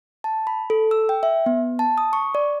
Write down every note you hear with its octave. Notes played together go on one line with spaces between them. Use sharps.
A5
B5
A4
E6
G5
E5
B3
A5
D#6
C#6
D5